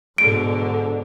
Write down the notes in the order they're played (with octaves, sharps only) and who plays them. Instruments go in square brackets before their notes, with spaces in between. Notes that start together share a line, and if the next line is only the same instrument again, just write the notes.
[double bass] G#2 B2 [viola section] D3 [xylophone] D7